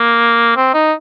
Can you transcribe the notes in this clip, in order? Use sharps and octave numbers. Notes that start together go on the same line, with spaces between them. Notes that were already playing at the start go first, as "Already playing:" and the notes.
Already playing: A#3
C4
D#4